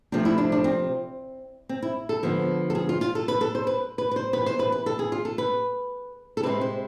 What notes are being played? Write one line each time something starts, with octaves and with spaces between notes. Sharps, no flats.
C3 F3 A3 C4 D4
E4
D4
D4
C4
C4
E4
A4
D3 F3 G#3 B3
A4
G#4
F4
F4
A4
B4
A4
C5
B4
B4
B4
C5
E3 B3 B4
C5
B4
B4
A4
G#4
F4
A4
B4
A4
C3 G#3 C4 B4
C5